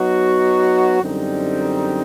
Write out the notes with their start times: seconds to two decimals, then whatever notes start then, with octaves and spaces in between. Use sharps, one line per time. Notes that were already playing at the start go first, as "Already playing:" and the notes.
Already playing: F#3 B3 D#4 F#4
1.02 F#2 D3 G3 C4 D#4